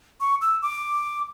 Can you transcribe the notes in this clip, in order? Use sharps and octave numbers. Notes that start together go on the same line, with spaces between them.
C#6
E6
D6